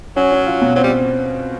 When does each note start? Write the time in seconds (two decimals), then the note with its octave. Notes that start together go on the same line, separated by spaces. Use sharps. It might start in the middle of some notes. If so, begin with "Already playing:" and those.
0.16 F#3 C#4
0.32 C#4
0.46 F4
0.62 B2
0.76 F#3 C4
0.84 G3